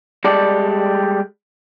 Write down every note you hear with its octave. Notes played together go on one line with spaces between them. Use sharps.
G3 G#3 A4 D5